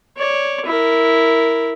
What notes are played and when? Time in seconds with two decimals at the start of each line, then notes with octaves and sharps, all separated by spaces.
0.17 C#5 D5
0.66 E4 A#4